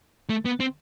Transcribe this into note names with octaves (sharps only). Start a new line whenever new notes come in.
A3
B3
C4